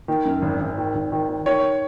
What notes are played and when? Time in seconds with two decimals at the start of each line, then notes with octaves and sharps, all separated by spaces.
0.08 D#3
0.25 F#2
0.42 G#1
0.60 G#1
0.78 D#3
0.95 G#1
1.12 D#3
1.29 D#3
1.46 D#3 C#5